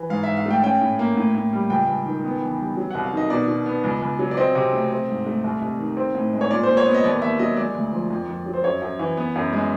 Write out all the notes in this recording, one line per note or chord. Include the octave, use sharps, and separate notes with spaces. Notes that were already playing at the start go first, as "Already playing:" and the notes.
Already playing: E3
G#2 F5
G#2 E5
F5
A3 G5
C#4 G5
A2
A#3
A2
A2
G3
C#2 G5
C#2
D#3
B3
E2
G3
F#3
C2 F#5
F5
D#3 D#5
B2 D5
B2
B3
C#2
C#2
F#3
D5
C4 D#5
C3
A3
C4
G#2
A3
C2
C2
D#3
C4
A2
G#3
C#5
A#2 D5
A#2 C5
C#5
B3
D#5
D#2 D5
D#2 E5
F#3 D#5
G#3 D5
D2
F3
F2
F2
F#3
C5
F#2 C#5
F#2
E3
B3
F#2
G#3